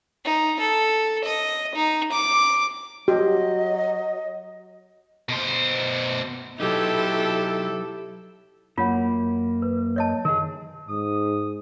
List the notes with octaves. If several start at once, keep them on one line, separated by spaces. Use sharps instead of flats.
D#4
A4
D#5
D#4
D6
F#3 F#4 G4 D#5
B2 C5
F#3 D#4 E4 G4 A4
F#2 A#3 F4 C#5 F#5
B4
C#5 D#5 A5
D#3 G#4 A#4 D#5
G#2 D#6